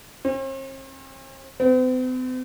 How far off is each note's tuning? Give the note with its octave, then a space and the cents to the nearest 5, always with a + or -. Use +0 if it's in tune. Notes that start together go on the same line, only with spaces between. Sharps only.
C4 +45
C4 -45